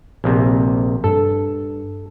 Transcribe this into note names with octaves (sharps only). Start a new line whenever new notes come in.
A#1 C3
G2 A4